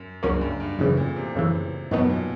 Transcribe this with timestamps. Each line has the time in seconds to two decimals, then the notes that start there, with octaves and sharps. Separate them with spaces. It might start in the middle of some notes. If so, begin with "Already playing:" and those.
Already playing: F#2
0.23 C#2 G2 C#3 F#3 A#3 C#4
0.41 F#2
0.60 G2
0.78 F#2 A2 C#3 E3
0.97 A#2
1.16 C3
1.35 F#2 C#3 E3
1.91 F#2 B2 D#3 F#3 B3 D#4
2.10 A#2